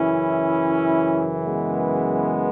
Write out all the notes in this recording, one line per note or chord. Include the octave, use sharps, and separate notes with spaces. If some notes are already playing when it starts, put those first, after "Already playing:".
Already playing: F#2 C#3 E3 C#4 E4
G#3 B3